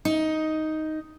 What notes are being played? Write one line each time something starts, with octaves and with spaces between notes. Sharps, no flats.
D#4